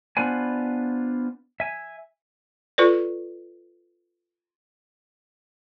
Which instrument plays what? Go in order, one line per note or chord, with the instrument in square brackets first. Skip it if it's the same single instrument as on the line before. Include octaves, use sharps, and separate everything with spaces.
[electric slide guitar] B3 D4 F4 B4 C5 G#5
E5 G#5
[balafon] F4 A4 B4 D5